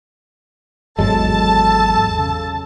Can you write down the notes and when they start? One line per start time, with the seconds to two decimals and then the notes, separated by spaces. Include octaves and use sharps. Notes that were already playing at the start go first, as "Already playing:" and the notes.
0.99 G#1 E2 G#2 F#3 G#3 A4 A5
2.19 C#3